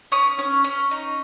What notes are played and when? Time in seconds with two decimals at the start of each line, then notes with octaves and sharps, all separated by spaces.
0.12 C#4 D#6
0.38 C#4
0.64 C#4
0.91 D#4